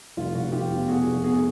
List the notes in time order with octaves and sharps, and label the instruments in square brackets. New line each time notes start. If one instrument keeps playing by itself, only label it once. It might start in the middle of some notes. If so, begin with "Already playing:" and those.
[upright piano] F1 [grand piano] F4
[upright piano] F1 [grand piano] F#4
[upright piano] F1 [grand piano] F4 G4
[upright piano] E2
[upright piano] B2 [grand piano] F#4 G#4
[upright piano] F1
[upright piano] B2 [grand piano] F#4 G#4